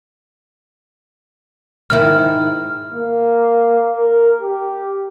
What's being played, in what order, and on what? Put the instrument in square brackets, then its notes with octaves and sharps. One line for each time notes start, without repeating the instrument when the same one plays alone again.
[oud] G#2 D#3 E4 [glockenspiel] F6
[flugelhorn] A#3
A#4
G4